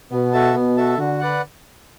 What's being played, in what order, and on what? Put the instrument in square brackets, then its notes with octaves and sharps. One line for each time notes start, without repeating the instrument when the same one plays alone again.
[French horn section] B2 [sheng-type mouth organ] B3
[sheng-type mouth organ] F#4 A4 E5 A5
[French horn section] B2 [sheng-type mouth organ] B3
[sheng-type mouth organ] F#4 A4 E5 A5
[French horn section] D3 [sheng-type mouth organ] F#4
[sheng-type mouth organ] B4 D5 F#5